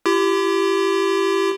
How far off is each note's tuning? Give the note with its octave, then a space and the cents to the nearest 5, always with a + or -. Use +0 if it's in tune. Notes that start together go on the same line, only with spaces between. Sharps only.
E4 +45 G4 -5